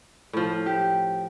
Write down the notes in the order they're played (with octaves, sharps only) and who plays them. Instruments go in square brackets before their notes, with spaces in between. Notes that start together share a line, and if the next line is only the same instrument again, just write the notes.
[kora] A2 F3
[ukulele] G4